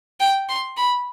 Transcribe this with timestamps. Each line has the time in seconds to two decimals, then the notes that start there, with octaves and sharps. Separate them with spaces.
0.20 G5
0.49 C6
0.77 B5